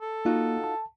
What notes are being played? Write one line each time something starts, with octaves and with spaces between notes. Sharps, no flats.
A4
A#3 D#4 F4 F#4
A5